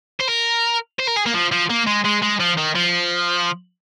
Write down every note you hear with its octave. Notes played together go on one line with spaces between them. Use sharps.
C5
A#4
C5
A#4
G#4
A#3
F3
F3
A#3
G#3
G#3
G#3
F3
D#3
F3